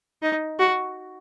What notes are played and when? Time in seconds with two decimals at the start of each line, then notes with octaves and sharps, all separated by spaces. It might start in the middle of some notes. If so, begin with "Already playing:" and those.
0.22 D#4
0.59 F#4